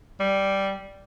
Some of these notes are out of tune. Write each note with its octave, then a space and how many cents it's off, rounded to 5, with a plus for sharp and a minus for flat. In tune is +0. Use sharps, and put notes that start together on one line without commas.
G3 -5